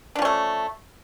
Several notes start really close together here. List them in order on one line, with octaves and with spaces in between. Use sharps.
D4 F3 C#4 A3